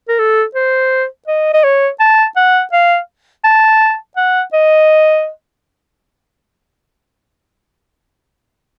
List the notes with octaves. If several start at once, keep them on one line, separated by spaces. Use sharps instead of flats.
A#4
A4
C5
D#5
D#5
C#5
A5
F#5
F5
A5
F#5
D#5